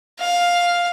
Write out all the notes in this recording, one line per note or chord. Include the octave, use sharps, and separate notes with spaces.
F5